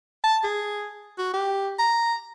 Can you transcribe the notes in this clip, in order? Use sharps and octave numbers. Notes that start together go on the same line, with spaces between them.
A5
G#4
F#4
G4
A#5